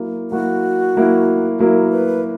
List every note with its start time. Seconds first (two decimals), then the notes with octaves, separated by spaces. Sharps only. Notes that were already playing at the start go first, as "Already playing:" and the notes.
Already playing: F#3 A#3 E4
0.30 F#3 A#3 E4 F#4
0.95 F#3 A#3 E4
1.59 F#3 A#3 E4 A#4
1.92 B4